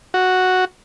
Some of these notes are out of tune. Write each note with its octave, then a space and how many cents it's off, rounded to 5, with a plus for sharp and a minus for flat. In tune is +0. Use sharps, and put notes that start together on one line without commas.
F#4 +0